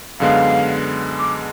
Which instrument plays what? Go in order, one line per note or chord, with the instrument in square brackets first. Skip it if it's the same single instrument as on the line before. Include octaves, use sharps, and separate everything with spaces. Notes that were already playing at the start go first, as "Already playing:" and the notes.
[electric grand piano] F#2 D3 G#3 B3 [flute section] F5
[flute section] D6